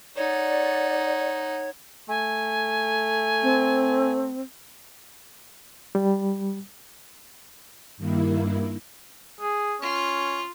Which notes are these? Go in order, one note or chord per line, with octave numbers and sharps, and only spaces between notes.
D#4 C#5 D5 F#5
A3 G#5
C4
G3
G2 D#3 A#3 E4
G#4
C#4 F4